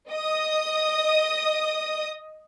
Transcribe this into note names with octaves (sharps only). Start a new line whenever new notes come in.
D#5 D#6